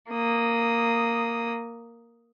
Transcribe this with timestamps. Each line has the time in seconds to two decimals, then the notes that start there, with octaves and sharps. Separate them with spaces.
0.11 A#3 D#6